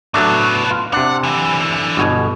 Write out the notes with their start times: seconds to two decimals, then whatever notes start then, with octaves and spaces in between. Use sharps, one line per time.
0.14 A2 F#3 A3 B3 D4
0.71 F4
0.93 C3 D4 F#5
1.23 D3 E3
1.97 G1 B2 G#5